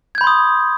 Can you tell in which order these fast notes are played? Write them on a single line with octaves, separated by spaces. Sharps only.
G#6 G6 B5 C6 D#6